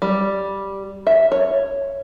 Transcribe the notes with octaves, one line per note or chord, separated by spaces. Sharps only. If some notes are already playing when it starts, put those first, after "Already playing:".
G3
E5
C#5